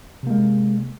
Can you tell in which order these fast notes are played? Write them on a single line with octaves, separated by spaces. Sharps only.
C3 A#3 G#3